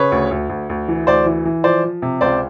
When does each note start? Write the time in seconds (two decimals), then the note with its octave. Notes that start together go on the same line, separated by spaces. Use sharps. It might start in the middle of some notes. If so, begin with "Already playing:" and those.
Already playing: C#3 B4 C#5
0.12 D2
0.31 D2
0.49 D2
0.70 D2
0.88 E3
1.07 D2 C5 D5
1.26 E3
1.45 E3
1.64 F3 C5 D5
1.84 F3
2.02 C3
2.21 C#2 C5 D5